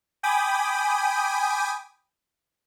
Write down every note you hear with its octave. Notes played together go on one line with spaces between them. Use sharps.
G5 G#5 B5 D6 D#6